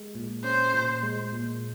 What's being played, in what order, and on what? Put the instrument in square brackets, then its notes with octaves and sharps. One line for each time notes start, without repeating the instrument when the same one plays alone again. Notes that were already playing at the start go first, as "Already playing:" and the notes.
Already playing: [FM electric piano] G#3
A#2
[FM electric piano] C#4 [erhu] C5
[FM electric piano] A#2
G#3
A#2